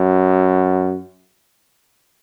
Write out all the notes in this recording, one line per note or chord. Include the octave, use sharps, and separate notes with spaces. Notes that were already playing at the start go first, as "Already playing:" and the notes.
Already playing: F#2